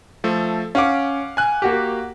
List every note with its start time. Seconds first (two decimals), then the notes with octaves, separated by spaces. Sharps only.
0.24 F3 A3 A4
0.75 C#4 F5 F#5 D6
1.37 G#5 F#6
1.62 A#3 F#4 G4